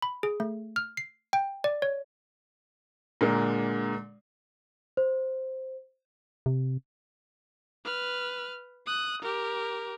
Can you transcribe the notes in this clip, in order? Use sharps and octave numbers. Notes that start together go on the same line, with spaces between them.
B5
G#4
A3
F6
C7
G5
D5
C#5
A#2 D3 G#3 A#3
C5
C3
B4 F6
D#6 F#6
G4 A#4